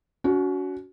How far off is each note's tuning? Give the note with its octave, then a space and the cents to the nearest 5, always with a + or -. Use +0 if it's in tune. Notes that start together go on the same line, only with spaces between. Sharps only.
C#4 +40 F#4 +0